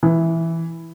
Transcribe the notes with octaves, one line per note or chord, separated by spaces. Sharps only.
E3